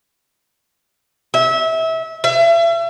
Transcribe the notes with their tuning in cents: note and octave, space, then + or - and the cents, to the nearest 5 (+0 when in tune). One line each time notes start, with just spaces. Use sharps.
E5 -25
E5 +35